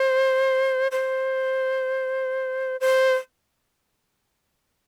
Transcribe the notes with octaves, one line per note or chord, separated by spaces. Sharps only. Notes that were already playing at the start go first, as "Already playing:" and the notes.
Already playing: C5
C5
C5